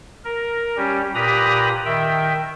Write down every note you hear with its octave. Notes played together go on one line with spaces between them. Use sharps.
A#4
G3 C#4 G4
A#2 G4 B4 A#5 B5 D#6
D#3 E5 G5